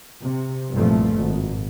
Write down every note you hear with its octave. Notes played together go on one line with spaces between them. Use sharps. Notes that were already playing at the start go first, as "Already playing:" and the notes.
C3
C2 G2 A#2 F3 A3
G#1